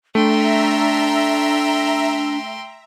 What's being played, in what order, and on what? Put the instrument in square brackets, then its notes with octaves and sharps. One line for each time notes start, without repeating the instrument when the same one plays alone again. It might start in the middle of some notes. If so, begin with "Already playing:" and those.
[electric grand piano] A3 [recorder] D4 [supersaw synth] E5 A#5 [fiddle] G5 C6